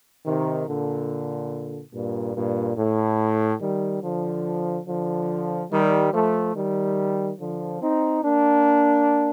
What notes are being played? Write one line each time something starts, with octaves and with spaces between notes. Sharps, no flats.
C3 D#3
A#2 D3
G2 A#2
G2 A#2
A2
D#3 G3
D3 F3
D3 F3
D#3 G3
F3 A3
D#3 G3
D3 F3
C4 D#4
A#3 D4